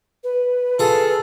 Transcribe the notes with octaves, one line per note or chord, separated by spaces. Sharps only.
B4
F4 G#4 A4